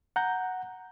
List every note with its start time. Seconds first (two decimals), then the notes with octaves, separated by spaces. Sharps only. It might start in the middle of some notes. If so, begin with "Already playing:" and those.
0.16 F#5 A#5 G6